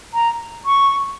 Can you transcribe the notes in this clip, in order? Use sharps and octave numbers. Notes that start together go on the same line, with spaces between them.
A#5
C#6